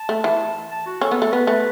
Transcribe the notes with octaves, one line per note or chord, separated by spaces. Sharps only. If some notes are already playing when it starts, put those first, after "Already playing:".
Already playing: A5
A3
E3
A5
F#4
C#4 A4
B3
A3
B3 B4
A3